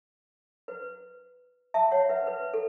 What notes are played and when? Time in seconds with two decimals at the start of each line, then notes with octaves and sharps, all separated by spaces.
0.68 B4
1.74 E5 A5
1.91 C#5 F#5
2.09 B4 E5
2.27 B4
2.54 A4